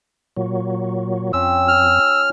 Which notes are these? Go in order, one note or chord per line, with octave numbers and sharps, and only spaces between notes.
A#2 F#3
F2 C#4 F4 G5 E6
F6